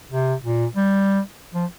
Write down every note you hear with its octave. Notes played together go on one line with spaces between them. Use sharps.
C3
A#2
G3
F3